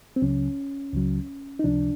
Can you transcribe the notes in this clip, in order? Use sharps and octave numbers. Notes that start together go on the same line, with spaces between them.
C4
C#2 C#3 F#3 C#4
C#2 C#3 F#3
D#4
C#2 C3 F3 D4